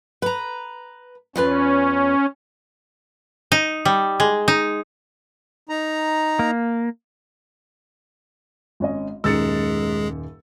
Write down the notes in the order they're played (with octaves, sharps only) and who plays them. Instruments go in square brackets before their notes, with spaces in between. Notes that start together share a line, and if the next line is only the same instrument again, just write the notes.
[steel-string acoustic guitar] B4 A#5
[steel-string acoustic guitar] E2 F4 B4 [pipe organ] C#4
[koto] D#4
G3
G#3
D#4
[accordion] D#4 A#5
[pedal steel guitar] A#3
[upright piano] G#1 C#4 D#5
[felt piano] D#1 F#2 D#4 [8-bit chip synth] G#3 G#4 [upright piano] E6 A6 C#7